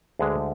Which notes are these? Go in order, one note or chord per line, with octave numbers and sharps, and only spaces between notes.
D2 D3 G#3 G#4 B4